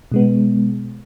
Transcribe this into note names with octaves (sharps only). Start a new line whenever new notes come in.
B2 G#3 B3